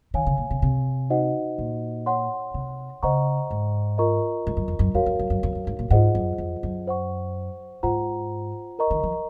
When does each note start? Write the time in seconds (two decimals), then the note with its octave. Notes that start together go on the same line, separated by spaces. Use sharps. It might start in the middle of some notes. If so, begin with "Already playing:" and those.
0.14 D#3 C#5 F5 G#5
0.27 C#3
0.38 A#2
0.50 C3
0.62 C3
1.10 D#4 F#4 C5 D#5 F#5
1.58 A#2
2.06 C#5 F#5 C6
2.54 C3
3.03 C#3 C5 D#5 F#5 A#5 C#6
3.50 G#2
3.98 F4 A#4 D#5 A#5 C#6
4.47 G#2
4.57 F#2
4.68 F2
4.79 F#2
4.94 F2 F#4 A#4 C#5 F5
5.06 F2
5.19 F#2
5.30 F#2
5.43 F2
5.55 F#2
5.67 G#2
5.79 A#2
5.90 G#2 F4 G#4 C5 D#5 F#5
6.15 F#2
6.38 F2
6.63 F#2
6.87 C5 F#5 C#6
7.83 G#2 F4 C5 F#5 A#5
8.79 A#4 D#5 A#5 C#6
8.91 D#3
9.03 F3